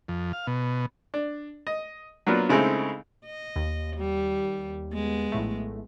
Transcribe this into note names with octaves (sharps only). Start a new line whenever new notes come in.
F2
F5
B2
D4
D#5
F#3 A#3 B3 D4 F4
C#3 G#3 A3 C4 D#4 E4
D#5
D#2
G3
G#3 B3
A#1 A2 A3